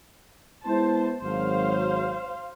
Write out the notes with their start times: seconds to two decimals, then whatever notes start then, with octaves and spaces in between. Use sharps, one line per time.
0.66 G#3 B3 E4 C5 A5
1.23 G#1 F#3 C5 F5